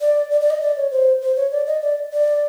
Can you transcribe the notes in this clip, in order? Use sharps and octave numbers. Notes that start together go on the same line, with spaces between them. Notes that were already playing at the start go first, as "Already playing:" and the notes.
D5
D5
D5
D#5
D5
C#5
C5
C5
C#5
D5
D#5
D5
D5